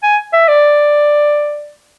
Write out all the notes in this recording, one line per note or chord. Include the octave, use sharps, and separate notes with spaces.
G#5
E5
D5